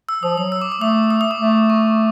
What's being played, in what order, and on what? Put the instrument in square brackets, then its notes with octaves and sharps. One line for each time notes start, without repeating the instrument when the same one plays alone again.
[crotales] E6
[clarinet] F3 [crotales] D#6
[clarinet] F#3 [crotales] D#6
[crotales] E6
D6
D6
[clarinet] A3 [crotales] D#6
[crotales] D#6
D#6
D6
[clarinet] A3
[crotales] C#6